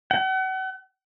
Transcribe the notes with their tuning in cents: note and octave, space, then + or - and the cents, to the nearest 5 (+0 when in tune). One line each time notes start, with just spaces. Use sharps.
F#5 +40